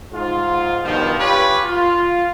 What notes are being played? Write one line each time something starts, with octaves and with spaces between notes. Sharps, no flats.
G#2 F4
G2 B2 D#3 F3
C#4 F4 G4 B4 C#5
F4